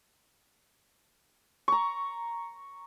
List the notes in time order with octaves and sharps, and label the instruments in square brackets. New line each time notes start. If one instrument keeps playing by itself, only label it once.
[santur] A#5 C#6